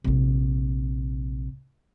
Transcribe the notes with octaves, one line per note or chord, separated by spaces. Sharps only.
A#1 C3